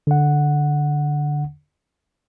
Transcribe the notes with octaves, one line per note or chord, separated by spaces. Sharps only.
D3 F#5